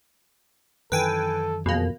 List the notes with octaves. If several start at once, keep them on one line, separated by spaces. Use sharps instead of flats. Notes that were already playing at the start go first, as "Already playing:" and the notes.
F#2 D#3 E3 A4 B4 G5 G#5
F2 B2 A#3 G#4